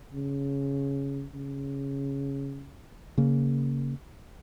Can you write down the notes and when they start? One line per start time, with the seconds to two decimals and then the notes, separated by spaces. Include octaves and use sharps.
0.13 C#3
1.34 C#3
3.18 C#3 A#3